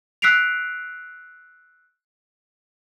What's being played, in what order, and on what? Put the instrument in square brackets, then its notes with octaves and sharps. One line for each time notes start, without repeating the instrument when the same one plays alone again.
[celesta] E6 F#6 B6 C7 D7 F7